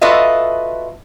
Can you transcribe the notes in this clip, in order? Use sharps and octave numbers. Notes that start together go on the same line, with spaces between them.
F4 F#4 A4 B4 D#5 E5